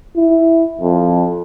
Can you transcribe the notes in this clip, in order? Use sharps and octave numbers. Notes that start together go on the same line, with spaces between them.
E4
F2